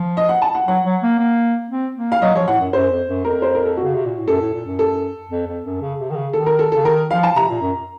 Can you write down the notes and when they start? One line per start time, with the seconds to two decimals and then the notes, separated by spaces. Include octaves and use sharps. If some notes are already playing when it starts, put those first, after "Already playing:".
Already playing: F3
0.17 D#5
0.29 F#5
0.42 A5
0.55 F#5
0.67 F#3 F#5
0.84 F#3
1.03 A#3
1.19 A#3
1.70 C4
1.96 A#3
2.12 F5
2.22 F#3 D#5
2.35 F3 C#5
2.47 A2 F#5
2.60 F#2
2.73 F#2 C5
2.91 F2
3.08 F#2
3.25 F2 A#4
3.42 C5
3.55 A#4
3.65 A4
3.77 F#4
3.84 C#3
3.95 C3
4.05 A#2
4.17 A2
4.28 F#2 A4
4.41 A2
4.54 A#2
4.66 F#2
4.79 A4
5.31 F2
5.47 F2
5.65 F#2
5.82 C#3
6.00 C3
6.11 D#3
6.16 C#3
6.33 D#3 A4
6.46 A#4
6.59 A4
6.72 C#3 A4
6.84 D#3 A#4
7.11 F3 F5
7.23 A5
7.36 C3 A#5
7.49 A#2
7.62 F#2